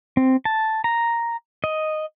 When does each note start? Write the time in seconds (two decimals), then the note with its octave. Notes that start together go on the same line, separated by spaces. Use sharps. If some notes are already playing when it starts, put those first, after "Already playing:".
0.17 C4
0.45 A5
0.84 A#5
1.64 D#5